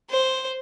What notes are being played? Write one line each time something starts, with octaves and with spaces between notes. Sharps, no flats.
C5